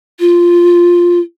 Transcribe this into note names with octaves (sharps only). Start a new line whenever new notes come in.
F4